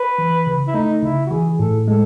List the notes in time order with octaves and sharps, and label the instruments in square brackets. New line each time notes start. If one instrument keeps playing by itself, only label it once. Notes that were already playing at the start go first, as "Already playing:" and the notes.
Already playing: [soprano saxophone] B4
[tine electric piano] E3
C#3
[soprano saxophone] E4
[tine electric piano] A3 [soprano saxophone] D#4
[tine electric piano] C#3 [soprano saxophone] E4
[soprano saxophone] F#4
[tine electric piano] E3 [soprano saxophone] G#4
[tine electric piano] A2 [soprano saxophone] A4
[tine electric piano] G#3 [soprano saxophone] A4